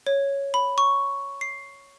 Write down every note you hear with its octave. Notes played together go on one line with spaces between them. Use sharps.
C#5
B5
C#6
C7